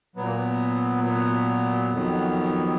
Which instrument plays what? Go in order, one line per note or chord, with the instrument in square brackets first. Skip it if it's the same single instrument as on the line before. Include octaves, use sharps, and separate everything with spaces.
[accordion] A#2 F#3 B3
A#3
B3
B3
F2 D#3 F#3